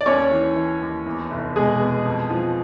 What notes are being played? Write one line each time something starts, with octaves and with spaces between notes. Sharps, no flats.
D5
D#2 C#4 C#5
E3
E3
D#2
E2
F1
B2 G#3 G#4
B2
F2
F3